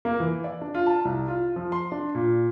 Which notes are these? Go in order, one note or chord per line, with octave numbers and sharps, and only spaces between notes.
A#3
E3
D5
D4
F4
A5
C2
F4
F3
C6
D4
A#2